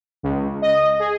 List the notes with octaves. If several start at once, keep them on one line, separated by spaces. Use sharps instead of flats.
C#2
D#5
G#4